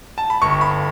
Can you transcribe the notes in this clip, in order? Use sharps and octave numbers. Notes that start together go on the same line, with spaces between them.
A5
B5
G1 C#6
B5